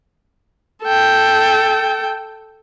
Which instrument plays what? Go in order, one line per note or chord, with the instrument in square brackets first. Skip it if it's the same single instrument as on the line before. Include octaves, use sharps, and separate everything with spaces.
[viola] A4 G5